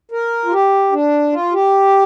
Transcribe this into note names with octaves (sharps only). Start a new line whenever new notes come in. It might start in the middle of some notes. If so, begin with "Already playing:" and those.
A#4
F4
G4
D4
F4
G4